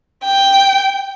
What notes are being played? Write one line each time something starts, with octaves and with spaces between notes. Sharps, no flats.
G5